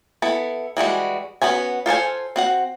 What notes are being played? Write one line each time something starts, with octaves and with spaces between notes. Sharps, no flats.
B3 E4 A4
E3 G3 G#3 F#4
B3 C#4 F#4 G#5
F4 A4 C5 G#5
C4 F#4 F#5